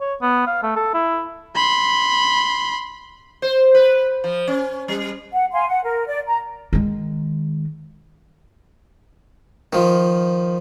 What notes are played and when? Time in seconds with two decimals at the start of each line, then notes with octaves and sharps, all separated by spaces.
0.01 C#5
0.22 B3
0.47 F5
0.63 A3
0.76 A4
0.94 E4
1.56 B5 C6
3.42 C5
3.75 B4
4.24 F3
4.47 C#4
4.88 G3
5.33 F#5
5.52 F5 G#5 C6
5.68 F#5
5.85 A#4
6.07 D5
6.26 A#5
6.73 D#3 G#3
9.73 D#3 F3